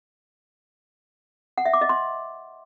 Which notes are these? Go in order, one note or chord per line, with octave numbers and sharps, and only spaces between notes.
F#5
E5
D6
D#5
C6